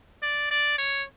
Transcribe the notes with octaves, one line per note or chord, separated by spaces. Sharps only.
D5
D5
C#5